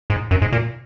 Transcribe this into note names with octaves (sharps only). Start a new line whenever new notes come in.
G#2
F#2
G#2
A#2